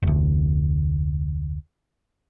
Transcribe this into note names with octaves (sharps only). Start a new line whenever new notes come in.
F1 D2